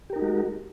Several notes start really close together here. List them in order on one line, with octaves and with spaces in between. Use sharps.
G4 A#4 D#4 F#4 G#3